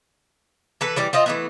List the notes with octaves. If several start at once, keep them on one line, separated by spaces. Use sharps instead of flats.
E3 A4 B4
E3 G3 D5
C4 F4 D#5
E3 A3 B3